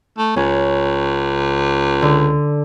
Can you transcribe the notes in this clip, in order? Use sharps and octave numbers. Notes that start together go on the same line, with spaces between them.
A3
C#2 C#4
D3